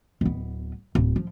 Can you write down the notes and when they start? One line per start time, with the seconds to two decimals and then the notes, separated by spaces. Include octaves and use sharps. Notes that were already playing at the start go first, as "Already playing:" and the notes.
0.21 D1 B3
0.95 D1
1.16 F3